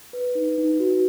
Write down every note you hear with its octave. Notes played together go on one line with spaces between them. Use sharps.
B4
D#4
D#4
F#4